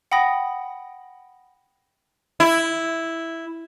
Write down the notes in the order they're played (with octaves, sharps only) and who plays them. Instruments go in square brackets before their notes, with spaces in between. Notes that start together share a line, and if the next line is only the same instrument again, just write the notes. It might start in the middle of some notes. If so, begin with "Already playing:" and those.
[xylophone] F#5 G5 B5 D#6 A#6
[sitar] E4